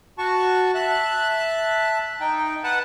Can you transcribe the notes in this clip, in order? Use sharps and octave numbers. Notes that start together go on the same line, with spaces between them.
F#4 A5 C#6
E5 A5 F#6
D#4 G5
B4 F#5 A5